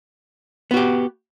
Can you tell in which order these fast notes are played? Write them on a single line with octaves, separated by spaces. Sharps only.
B3 F#4 G4